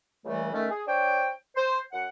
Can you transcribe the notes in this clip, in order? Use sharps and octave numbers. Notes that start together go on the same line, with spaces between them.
C#2 A#2 C#3 E3 G3 A3
D#3 A3 C#4
G#4
D4 C5 C#5 G5
C5
F#2 F#5